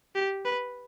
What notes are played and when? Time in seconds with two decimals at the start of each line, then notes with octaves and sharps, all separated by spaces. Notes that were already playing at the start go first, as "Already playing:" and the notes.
0.15 G4
0.45 B4